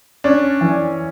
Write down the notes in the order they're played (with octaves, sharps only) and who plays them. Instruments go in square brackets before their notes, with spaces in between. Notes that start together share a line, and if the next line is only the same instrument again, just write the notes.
[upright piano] C#4 [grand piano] D4
[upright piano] E3